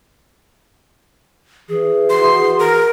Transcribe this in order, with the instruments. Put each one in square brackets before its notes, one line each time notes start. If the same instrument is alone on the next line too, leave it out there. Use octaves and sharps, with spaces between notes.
[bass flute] E3 [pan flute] G#4
[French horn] F#4 [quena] C6
[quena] A#4